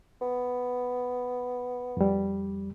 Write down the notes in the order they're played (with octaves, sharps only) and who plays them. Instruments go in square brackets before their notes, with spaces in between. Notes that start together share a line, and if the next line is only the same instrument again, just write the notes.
[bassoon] B3
[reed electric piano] F2 G3